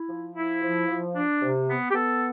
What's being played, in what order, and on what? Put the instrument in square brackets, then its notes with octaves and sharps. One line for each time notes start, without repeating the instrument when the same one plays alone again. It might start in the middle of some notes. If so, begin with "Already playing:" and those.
Already playing: [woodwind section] E4
F3
E4
F3
F3
D4
C3
B3
G4
B3 A4